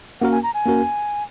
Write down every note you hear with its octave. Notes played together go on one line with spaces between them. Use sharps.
A#3 C#4 F#4 A#4 F#5
G#5
A#5
G#5
A#3 C#4 F#4 A#4